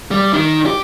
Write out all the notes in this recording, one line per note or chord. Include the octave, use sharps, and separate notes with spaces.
G3
D#3
G4